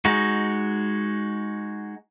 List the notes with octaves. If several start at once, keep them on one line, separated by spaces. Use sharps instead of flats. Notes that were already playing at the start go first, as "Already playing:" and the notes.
G#3 D#4 F#4